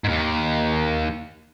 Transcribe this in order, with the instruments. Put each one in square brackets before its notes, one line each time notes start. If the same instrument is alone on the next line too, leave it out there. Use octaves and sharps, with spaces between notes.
[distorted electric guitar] D#2 G#2